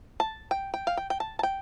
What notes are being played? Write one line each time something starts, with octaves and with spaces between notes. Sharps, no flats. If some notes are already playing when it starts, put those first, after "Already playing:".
A5
G5
G5
F5
G5
G5
A5
A5
G5